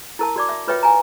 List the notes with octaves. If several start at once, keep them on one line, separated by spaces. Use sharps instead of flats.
E4 A#4 A5
F#4 D5 D6
E5
F4 B4 C#5 D#5 E5 G5
G#5 A#5